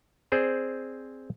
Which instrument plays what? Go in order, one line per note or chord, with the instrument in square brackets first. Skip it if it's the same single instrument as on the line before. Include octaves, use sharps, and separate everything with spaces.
[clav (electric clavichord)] C4 G#4 C5 D5